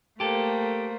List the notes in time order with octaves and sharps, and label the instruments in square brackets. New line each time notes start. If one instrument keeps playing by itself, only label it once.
[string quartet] A3 A#3 C5 [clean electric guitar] G4 A4